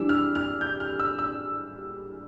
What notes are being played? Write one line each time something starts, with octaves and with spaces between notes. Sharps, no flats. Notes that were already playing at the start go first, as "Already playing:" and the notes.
Already playing: E3 G3 D4 E6
F6
F6
G6
F6
E6
E6